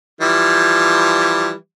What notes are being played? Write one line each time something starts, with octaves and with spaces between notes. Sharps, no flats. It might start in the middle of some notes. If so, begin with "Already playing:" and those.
E3 F3 G3